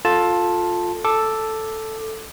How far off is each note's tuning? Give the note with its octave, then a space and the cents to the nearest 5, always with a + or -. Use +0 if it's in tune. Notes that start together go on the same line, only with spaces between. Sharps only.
F4 +15 A4 +0 A5 +0
A4 +0 D6 +10